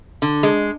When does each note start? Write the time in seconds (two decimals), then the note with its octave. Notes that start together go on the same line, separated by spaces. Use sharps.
0.22 D3
0.43 G#3